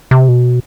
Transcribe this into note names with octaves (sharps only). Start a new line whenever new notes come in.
C3
B2